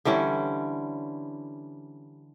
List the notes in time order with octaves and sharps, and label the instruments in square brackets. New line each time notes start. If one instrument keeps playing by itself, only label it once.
[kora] D3 E3 G3 C#4